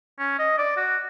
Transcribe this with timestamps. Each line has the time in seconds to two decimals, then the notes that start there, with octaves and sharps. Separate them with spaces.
0.19 C#4
0.39 D#5
0.58 D5
0.77 F#4